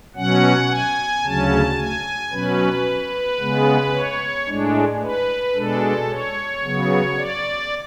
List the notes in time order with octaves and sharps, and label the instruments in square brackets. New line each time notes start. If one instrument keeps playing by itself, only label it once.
[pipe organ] B2 F#3 C#4 F#5
G#5
D2 C#3 F#3 C#4 A5
G#5
B2 F#3 C#4 B4
C#3 G#3 B3
C#5
A2 G#3 D4
B4
B2 G#3 D4 A4
C#5
C#3 F#3 B3
D5